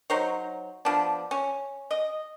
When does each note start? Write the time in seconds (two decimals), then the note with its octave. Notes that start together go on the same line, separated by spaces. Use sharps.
0.10 F#3 D#4 C5 C#5
0.85 F3 B3 D4
1.31 C#4
1.91 D#5